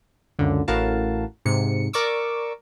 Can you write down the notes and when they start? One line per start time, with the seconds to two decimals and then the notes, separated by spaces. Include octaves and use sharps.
0.39 C#2 F#2 D3
0.68 A1 A2 F#4 A#4 F5 A5
1.45 G#2 C3 C#7
1.93 A#4 D5 C#6 D6 E6